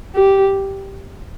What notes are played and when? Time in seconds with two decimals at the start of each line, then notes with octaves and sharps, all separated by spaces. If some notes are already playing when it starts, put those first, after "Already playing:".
0.15 G4